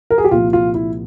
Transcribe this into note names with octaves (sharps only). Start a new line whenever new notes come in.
A#4
G#4
G4
C2 A#2 F3 F4
F4
E4